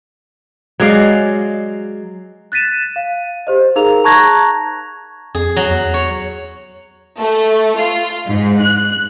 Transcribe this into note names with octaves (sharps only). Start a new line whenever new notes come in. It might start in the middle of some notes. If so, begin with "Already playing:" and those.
F#3 G#3 D5 F5
F#6 A6 B6 D#7 E7
F5
G4 C5 D#5
D#4 G#4 A#4 F5 A#5 F7
A5 A#5 C#6 F#6 G#6 A#6
F2 G#4
F#3
E2
C#5
A3
F4
G#2
F#6